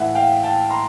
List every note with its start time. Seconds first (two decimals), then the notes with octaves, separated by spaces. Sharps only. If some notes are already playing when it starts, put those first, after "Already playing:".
Already playing: A2 E3 E5 F#5
0.15 F5 G5
0.43 G5 A5
0.70 A#5 C6